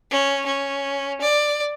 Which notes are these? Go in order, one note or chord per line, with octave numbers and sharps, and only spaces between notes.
C#4
C#4
D5